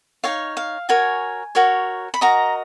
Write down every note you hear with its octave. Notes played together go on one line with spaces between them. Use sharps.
D#4 F#4 C#5 F5
F5
F#4 A#4 C#5 G#5
F#4 A#4 C#5
B5
F#4 A#4 D#5 A#5